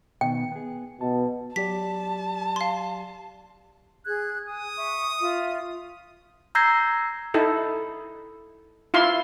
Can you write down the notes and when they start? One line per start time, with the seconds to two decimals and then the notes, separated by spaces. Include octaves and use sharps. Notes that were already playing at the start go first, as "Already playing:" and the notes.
0.21 B2 D#3 B3 G5
0.52 B3 G#4
1.01 B1 B2 A5
1.56 F#3 G4 D5 A5 B6
2.56 F5 C6
4.06 G#4 F#6 G#6
4.49 G#5 D#6
4.78 E5 C#6
5.20 F4 E5
6.55 A#5 E6 G6 G#6 A#6 C7
7.34 D#4 E4 A4
8.94 E4 F4 F5 C6